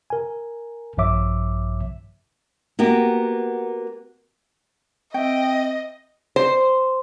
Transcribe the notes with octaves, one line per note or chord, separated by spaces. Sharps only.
A#4 G#5
A#1 G2 F3 C#5 E5 D6
A#3 B3 F#4 G4
C4 D#5 E5 G5
C5